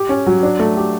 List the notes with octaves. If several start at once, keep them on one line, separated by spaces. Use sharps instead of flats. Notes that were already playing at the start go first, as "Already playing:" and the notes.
Already playing: G4
C#4
F#3
D4
A3
G4